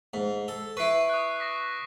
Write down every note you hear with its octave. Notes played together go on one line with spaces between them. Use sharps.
G#2
A4
E4 B4 C#6 C7 D7
D#6 F#6
D6 A#6 B6